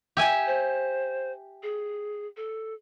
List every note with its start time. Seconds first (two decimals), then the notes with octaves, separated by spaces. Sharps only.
0.17 G4 E5 G#5
0.47 C5
1.63 G#4
2.37 A4